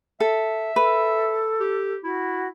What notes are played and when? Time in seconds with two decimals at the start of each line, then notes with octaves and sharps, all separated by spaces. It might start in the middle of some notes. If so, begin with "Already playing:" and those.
0.20 A4 E5
0.76 A4 B4
1.60 G4
2.04 E4 F#4